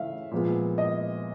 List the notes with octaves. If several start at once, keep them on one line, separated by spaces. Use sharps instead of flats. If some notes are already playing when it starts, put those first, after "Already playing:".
Already playing: C#3 E3 A3 E5 F5
A#2 F3 G#3 B3
D#5